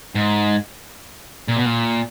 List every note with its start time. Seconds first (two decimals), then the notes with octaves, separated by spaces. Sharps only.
0.15 G#2
1.48 A#2
1.57 B2
1.65 A#2